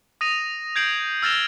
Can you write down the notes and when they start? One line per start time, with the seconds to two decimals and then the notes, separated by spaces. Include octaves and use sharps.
0.21 D#6 A#6 D#7 F7
0.76 G6 G#6 C7 D7 F7 F#7
1.22 E6 F6 A6 A#6 E7 F7